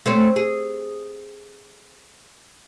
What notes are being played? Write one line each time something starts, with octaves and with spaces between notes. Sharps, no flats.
A3 C4 C#4
G#4